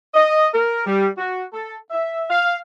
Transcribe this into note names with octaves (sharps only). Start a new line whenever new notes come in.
D#5
A#4
G3
F#4
A4
E5
F5